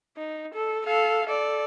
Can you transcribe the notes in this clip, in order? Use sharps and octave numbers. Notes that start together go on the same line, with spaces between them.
D#4
A4
A4 F5
A4 D5